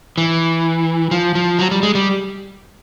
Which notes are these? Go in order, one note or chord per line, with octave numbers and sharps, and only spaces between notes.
E3
F3
F3
F#3
G3
G#3
G3